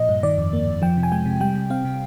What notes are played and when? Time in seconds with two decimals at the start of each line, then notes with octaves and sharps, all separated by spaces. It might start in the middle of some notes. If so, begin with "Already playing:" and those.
Already playing: A#2 F3 D#5
0.09 G2
0.23 D#3 D5
0.38 F2
0.53 A#3
0.67 F2
0.82 F3 G5
0.97 C3
1.03 G#5
1.12 G#3 G5
1.26 C3
1.40 G3 G5
1.55 C3
1.70 C4 F5
1.85 C3